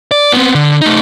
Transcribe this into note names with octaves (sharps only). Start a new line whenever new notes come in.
D5
B3 C4
D3
A3 D#4